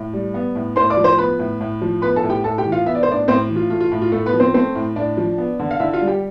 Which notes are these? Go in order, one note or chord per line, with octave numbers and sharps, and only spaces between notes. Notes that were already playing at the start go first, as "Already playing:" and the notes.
Already playing: A2
G3
B3
A2
A2 C5 C6
D5 D6
F3
C5 C6
B3 B4 B5
A2
A2
F3
B3 B4 B5
A4 A5
A2
G4 G5
A2 A4 A5
G4 G5
E3
F4 F5
B3 E5
D5
C5
A2 D4 D5
A2 C4 C5
E3
F4
A3 F4
F4
A2
F4
A2 A3 A4
B3 B4
F3
C4 C5
A3 C4 C5
A2
A2 D4 D5
F3
B3
D3
F5
D3 E4 E5
F4 F5
G3
G4 G5